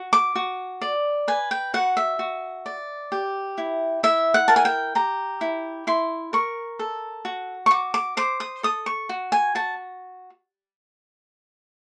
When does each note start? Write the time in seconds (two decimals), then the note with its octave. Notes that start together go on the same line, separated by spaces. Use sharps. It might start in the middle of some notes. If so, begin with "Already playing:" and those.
Already playing: F#4
0.13 D6
0.36 F#4
0.81 D5
1.28 B4 G#5
1.51 G5
1.74 F#4 F#5
1.97 E5
2.19 F#4
2.66 D5
3.12 G4
3.58 E4
4.03 E4 E5
4.34 F#5
4.48 A#4 A5
4.56 G#5
4.65 G5
4.95 G4 A#5
5.41 E4
5.87 E4 C6
6.33 A#4 C#6
6.79 A4
7.25 F#4
7.66 C#6
7.71 F#4 D6
7.94 D6
8.17 C5 D6
8.40 D#6
8.63 A4 D#6
8.86 C#6
9.09 F#4
9.32 G#5
9.55 F#4 A5